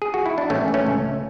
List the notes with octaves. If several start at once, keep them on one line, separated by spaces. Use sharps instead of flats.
G#4
F#4
E4
D4
A1 A3 C#4
A1
A3 C#4
C#2